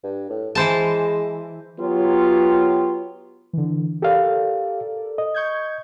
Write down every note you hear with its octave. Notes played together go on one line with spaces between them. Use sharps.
G2
A2
E3 G#3 C5 A5
F#3 B3 F4 G4 C#5
D3 E3
G4 A4 A#4 D5 F5
D#5
C#6 G6 G#6